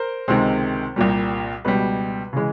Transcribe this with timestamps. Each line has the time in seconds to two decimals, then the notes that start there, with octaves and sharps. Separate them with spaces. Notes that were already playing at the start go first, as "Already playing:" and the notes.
Already playing: A#4 C5
0.28 C#2 C3 D#3 G#3 C4
0.96 C2 A#2 G3
1.65 C#2 B2 G3 B4
2.33 C#3 E3 G#3